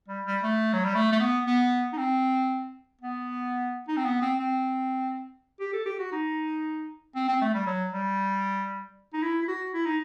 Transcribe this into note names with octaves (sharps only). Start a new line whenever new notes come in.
G3
G3
A3
F#3
G3
A3
A3
B3
B3
D#4
C4
B3
D#4
C4
B3
C4
C4
G4
A4
G4
F#4
D#4
C4
C4
A3
G3
F#3
G3
D#4
E4
E4
F#4
E4
D#4